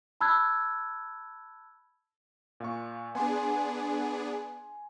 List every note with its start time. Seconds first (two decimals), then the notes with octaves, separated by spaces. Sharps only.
0.21 A5 B5 E6 F#6 G#6
2.60 A#2 F5 C#6
3.15 B3 D4 G#4 G#5 C6